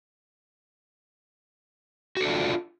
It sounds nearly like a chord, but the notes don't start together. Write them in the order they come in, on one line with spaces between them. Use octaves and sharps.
F#4 A4 D4 F4